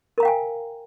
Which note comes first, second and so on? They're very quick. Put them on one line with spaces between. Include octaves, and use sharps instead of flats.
A#4 A#5 F5 G5 G#5